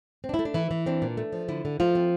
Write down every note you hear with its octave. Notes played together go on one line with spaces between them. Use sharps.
C4
D4
E4
A3
D4
E3 E4
E3
C4 D4
A#2
A3
F3
D3 E4
D3
F3 A3 F4
C4